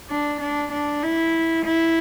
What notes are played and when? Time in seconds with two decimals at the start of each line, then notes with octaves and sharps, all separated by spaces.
0.10 D4
0.40 D4
0.72 D4
1.03 E4
1.65 E4